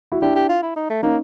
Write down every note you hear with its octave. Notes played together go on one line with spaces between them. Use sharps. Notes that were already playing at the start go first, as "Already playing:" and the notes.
E4 F#4
D4 E4 G4
G4
F4
E4
D#4
A3
A#3 C#4 D#4